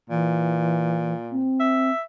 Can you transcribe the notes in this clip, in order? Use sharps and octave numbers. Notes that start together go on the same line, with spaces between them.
A#2 E3
C4
E5